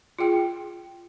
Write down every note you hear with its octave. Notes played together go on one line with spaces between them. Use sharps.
F4 G#4 G5